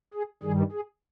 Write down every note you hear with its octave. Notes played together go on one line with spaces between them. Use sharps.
G#4
G2 D#3 G3 G#4
G#4